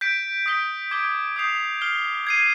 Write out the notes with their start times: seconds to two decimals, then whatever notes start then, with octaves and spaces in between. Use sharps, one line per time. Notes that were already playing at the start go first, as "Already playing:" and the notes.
0.01 G6 B6 D7
0.46 D#6 B6 D7 G7
0.91 D6 G#6 D7 G7
1.36 D#6 G6 C7 F7
1.81 F6 C7 G7
2.27 G#6 C7 D#7